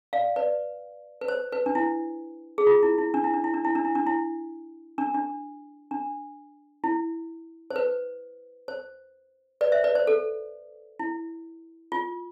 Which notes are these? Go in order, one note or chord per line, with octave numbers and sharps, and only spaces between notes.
D5 F5
B4 D5
B4
C5
B4
D4
E4
G#4
F4
E4
E4
D4
E4
D4
E4
D4
E4
D4
E4
D4
E4
D4
D4
D4
E4
C5
B4
C5
B4 D5
C5 E5
B4 D5
C5
A4
E4
F4